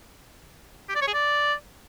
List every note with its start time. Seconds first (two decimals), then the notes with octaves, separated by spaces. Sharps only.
0.89 G4
0.95 D5
1.01 C#5
1.08 G#4
1.14 D5